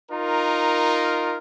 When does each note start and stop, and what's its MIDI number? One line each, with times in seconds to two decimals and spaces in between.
0.11 1.37 63
0.11 1.37 65
0.11 1.37 70